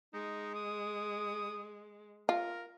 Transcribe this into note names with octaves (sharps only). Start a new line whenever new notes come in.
G#3 D#4
D#6
F4 A#4